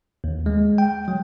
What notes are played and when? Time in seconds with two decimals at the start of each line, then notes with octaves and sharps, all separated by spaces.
0.24 D#2
0.46 G#3
0.78 G5
1.08 F#3